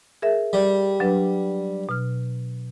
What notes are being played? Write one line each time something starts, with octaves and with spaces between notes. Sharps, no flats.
G#4 A#4 E5
G3
F#3 D4 B4
B2 F6